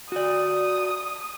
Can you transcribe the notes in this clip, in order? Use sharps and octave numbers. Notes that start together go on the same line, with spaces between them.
F#4 D5 D#6